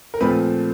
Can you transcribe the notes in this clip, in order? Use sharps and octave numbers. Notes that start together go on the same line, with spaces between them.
A#4
A#2 F3 A3 C4 B4